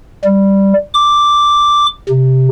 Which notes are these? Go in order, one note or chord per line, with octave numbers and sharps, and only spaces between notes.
G3
D6
C3